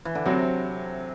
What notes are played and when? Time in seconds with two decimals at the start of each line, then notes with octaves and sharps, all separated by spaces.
0.05 E3
0.15 D3
0.26 C3 F#3 C4 F#4